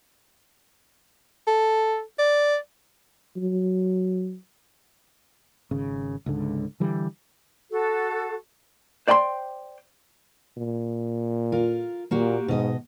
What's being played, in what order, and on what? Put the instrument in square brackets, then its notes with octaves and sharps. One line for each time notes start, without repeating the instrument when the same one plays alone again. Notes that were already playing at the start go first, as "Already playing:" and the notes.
[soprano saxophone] A4
D5
[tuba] F#3
[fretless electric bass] G#1 C#3
C#2 G#2 D3
D3 E3 G3
[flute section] F#4 A4
[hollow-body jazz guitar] C5 D5 G5 A5 C6
[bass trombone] A#2
[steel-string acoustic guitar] F4 A#4
[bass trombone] A#2 [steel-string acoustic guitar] A#3 F#4 G4
[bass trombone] G#2 [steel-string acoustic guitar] B2 D#5